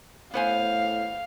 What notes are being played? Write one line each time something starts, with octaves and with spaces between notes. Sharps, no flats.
A2 B3 C5 F5 G#5